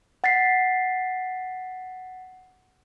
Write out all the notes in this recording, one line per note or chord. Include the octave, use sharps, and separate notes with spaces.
F#5 A6 B6 C7